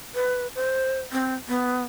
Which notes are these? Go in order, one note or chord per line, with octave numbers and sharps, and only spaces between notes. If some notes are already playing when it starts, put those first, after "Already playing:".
B4
C5
C4
B3